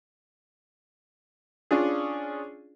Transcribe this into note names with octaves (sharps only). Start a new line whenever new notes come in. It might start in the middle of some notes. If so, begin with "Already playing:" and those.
C#4 D4 F4 G#4